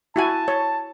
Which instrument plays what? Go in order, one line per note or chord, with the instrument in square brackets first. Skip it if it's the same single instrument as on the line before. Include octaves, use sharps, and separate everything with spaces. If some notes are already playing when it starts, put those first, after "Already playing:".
[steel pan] E4 F#4 G#5 [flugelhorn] A5
[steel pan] C#5